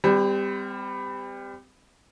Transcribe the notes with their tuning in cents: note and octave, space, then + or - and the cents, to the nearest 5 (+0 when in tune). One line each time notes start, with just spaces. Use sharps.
G3 +20 C4 -35